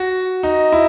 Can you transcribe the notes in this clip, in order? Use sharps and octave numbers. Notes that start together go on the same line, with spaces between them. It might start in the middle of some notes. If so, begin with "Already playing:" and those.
Already playing: F#4
D#4
E4